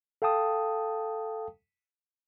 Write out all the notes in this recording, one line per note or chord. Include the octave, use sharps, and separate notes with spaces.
A4 F5 G5 A5 D#6